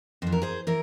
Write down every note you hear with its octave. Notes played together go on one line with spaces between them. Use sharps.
F2 E3 C5
A#4
G#4 C5
E3 A#4